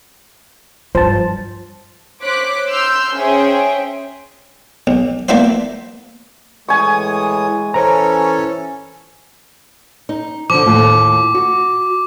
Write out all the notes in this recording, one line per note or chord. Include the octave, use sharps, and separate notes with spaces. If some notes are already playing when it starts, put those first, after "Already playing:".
G2 F3 C5 A5
C5 C#5 D6 F#6 B6
C6 E6 F6 G6
C#4 G#4 C5 E5 G5
B1
A#3 B3 D4 E4 F#4 C5
A2 E3 G#3 G#5 C#6 D#6
E3 C#4 A4 C5 C#5 A#5
D#4
D3 F3 D6
D#2 A2 F4
F#4